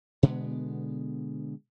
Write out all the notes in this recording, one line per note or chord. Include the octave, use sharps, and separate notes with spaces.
B2 D3 G#3 B3